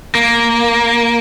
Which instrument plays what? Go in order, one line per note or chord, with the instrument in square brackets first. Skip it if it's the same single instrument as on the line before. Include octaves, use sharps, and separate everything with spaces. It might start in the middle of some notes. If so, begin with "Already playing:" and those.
[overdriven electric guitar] A#3